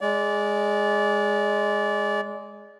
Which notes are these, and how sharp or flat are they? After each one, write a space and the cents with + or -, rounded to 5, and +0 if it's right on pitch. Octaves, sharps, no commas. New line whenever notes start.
G#3 +0 D5 -25